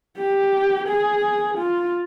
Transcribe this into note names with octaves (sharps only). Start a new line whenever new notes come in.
G4
G#4
F4